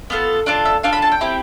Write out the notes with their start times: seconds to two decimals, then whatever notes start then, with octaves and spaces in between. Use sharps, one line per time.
0.10 B3 F4 A4
0.46 D4 F4 A4 D5
0.65 E5
0.83 D4 F4 A4 F5
0.93 B5
1.02 A5
1.12 G5
1.21 C4 E4 G4